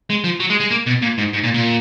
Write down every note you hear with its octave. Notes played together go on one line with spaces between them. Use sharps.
G#3
F3
F#3
G#3
G#3
A#3
B2
A#2
G#2
G#2
A#2
A#2